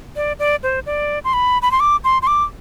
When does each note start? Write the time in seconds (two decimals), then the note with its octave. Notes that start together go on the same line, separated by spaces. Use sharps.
0.16 D5
0.39 D5
0.63 C5
0.86 D5
1.24 C6
1.33 B5
1.62 B5
1.71 C6
1.80 D6
2.04 C6
2.22 C6
2.27 D6